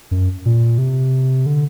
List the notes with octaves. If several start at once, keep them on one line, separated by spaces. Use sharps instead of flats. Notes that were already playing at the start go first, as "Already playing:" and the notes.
F#2
A#2
C3
D3